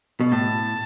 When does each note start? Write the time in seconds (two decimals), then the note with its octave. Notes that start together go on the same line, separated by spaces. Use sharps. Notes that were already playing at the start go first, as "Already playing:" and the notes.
0.20 B2
0.31 A2 A5